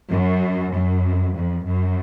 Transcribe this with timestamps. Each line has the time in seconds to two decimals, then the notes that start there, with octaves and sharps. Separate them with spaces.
0.10 F#2
0.73 F#2
1.36 F2
1.67 F#2